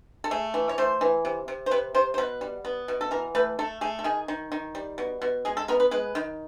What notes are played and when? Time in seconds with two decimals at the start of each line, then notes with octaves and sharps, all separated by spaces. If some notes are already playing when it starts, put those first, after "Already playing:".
0.24 A4
0.31 A3 G#4
0.54 E3
0.69 C#5
0.78 A3 C5
1.01 E3
1.25 C3
1.48 C3
1.66 C5
1.71 C3 B4
1.95 C3 C5
2.14 C5
2.18 B2 B4
2.41 G3
2.65 B3
2.88 B2
3.01 A4
3.11 E3 A#4
3.35 A3 B4
3.59 A3 A4
3.81 A3 G#4
3.99 A4
4.04 D#3 G#4
4.28 D#3
4.52 D#3
4.75 G3
4.98 B2
5.22 B2
5.45 G#3 G#4
5.57 A4
5.68 B3 A#4
5.80 B4
5.91 G#3 B4
6.15 D#3